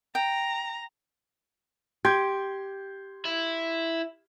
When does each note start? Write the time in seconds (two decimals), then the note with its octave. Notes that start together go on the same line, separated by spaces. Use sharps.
0.15 G5 A#5
2.05 G4 C6 G6 G#6
3.25 E4